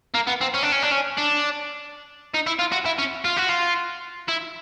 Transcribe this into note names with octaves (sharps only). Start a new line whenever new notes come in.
A#3
B3
C4
C#4
D4
C#4
D4
C#4
D4
D#4
E4
F4
F#4
E4
C#4
F4
F#4
F4
E4